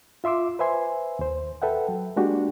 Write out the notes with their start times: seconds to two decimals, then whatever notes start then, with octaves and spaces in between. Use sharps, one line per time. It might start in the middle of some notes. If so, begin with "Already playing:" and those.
0.24 F4 E5 C6 D6 E6
0.59 B4 C5 E5 G#5 C6
1.19 D#2 C5
1.62 A4 B4 E5 F#5 G5
1.88 F#3
2.16 G#3 A#3 D4 F#4 G4